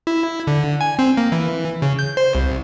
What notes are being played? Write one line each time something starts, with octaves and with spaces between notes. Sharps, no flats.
E4
D3
G#5
C4
A#3
E3
C#3
G6
C5
C2